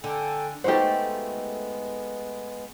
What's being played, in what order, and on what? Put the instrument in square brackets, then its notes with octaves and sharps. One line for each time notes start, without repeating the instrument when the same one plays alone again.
[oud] D3 [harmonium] A4 G5 G#5
[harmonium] G#3 B3 [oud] A3 D#4 F#4 [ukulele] G4 C5